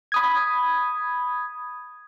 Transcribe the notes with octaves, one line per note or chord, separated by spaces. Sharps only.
B5 D#6 G#6